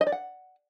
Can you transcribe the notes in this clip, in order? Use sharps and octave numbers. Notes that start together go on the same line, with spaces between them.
D#5
D5
F#5